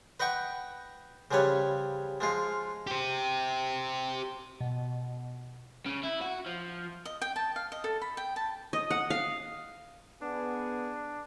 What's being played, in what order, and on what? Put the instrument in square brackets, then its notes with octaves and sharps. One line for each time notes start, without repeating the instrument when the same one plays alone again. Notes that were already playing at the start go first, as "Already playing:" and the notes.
[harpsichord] B4 D#5 F#5 G5 C#6
C#3 F3 G3 B4 C#5
F3 G#3 F4
[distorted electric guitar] G4 C5
[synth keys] B2
[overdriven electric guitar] C#3
E4
F#4
F3
[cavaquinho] D#5
G5
A5
F5
D#5
A4
B5
G5
A5
[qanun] D#5
F#5
F5
[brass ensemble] B3 G#4 [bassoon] D4